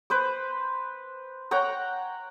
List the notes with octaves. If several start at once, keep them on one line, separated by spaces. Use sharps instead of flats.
B4 C5 D6
C#5 F#5 G5 A#5